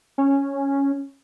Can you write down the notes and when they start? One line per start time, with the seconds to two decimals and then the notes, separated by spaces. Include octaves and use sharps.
0.18 C#4